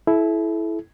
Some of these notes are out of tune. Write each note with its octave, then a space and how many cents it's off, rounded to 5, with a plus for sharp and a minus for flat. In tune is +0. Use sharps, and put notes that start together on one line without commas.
E4 +0 A4 -35